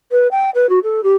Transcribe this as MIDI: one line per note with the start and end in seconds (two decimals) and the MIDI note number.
0.11 0.27 71
0.31 0.50 79
0.54 0.69 71
0.69 0.79 66
0.83 1.03 69
1.03 1.16 67